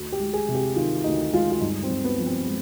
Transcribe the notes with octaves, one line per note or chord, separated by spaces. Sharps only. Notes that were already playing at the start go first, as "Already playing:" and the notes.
Already playing: D2
G4
G#3
G#4
C3
G4
D#3 F4
D2 D#4
G#3 F4
F4
G2 D#4
C4
G2
B3
F3
C4
G#3